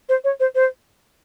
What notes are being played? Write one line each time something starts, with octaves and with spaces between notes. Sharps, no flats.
C5
C#5
C5
C5